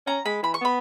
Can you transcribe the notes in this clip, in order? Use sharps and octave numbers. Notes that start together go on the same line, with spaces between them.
C#4 A#5
G#3 B5
E3 B5
C#6
B3 B5